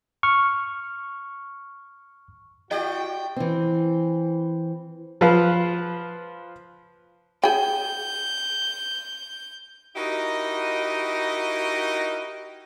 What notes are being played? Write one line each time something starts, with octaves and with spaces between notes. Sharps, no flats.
C#6 F6
E4 F#4 G4 D5 D#5 G5
E3 C4
F3 B4 F5
G#4 G5 G6
D#4 E4 F#4 G4 A#4 D#5